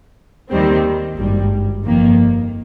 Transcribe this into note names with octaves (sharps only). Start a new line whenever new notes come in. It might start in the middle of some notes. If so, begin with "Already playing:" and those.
D#2 D#3 G3 C4
G#1 G2 G3
G1 F2 D#3 A#3